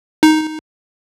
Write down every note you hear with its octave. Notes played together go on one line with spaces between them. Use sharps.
D#4